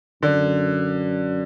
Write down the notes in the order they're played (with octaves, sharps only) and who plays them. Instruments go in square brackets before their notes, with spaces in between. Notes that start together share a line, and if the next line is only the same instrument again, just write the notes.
[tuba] F#2 [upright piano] D3